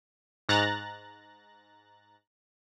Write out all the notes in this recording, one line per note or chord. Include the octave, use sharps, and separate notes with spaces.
G#2 A#5 F#6 A6 A#6